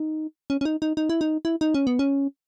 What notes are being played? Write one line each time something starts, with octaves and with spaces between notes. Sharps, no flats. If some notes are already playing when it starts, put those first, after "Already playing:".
Already playing: D#4
C#4
C#4
D#4
D#4
D#4
E4
D#4
E4
D#4
C#4
B3
C#4